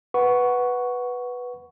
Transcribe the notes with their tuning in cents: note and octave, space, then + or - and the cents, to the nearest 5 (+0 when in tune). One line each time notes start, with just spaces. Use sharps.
B4 +0 F#5 +0 C#6 +5